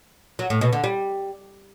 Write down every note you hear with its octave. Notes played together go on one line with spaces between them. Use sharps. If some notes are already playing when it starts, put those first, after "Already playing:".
F#3
A2
B2
D3
G3